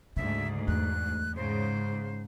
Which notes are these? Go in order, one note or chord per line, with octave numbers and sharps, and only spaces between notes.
D2 G#2 C#3 E5
E2 F#6
G#2 C#3 C5